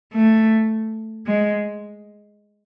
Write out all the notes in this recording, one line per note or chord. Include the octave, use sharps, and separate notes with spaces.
A3
G#3